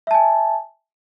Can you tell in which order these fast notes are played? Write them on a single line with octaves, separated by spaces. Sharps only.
E5 A5 G#5